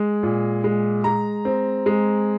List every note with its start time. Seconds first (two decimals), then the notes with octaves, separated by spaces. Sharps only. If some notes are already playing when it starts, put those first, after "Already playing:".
Already playing: G#3
0.23 A#2
0.64 G#3
1.04 G#3 A#5
1.45 C4
1.86 G#3